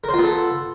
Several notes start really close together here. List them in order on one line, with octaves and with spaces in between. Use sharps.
A#4 C5 F4 B3 A4